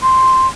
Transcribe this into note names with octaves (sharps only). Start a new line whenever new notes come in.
C6